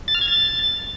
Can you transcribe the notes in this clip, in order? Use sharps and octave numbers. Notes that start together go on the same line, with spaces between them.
A6
F6
G#6
A6